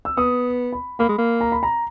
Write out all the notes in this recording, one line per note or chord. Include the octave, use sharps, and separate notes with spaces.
E6
B3 D#6
B5
A#3 B5
G#3
A#3
A#5
B5
A#5